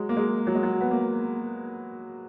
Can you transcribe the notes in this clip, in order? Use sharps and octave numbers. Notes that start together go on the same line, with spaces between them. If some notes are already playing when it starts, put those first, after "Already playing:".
Already playing: F#3 G#3
A#3
G#3
F#3
G#3
F#3
B3
A#3